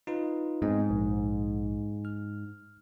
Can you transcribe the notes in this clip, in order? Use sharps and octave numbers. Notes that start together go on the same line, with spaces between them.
D#4 F4 B4
G#2 B3 C4 D#5
A#1
F6